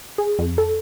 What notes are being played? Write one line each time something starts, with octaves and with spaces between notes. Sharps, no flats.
G#4
F2
A4